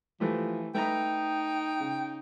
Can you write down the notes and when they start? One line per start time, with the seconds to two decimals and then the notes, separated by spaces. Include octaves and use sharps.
0.20 E3 F3 A3 G4
0.74 A3 D#4 B4 G5 A#5
1.80 C#3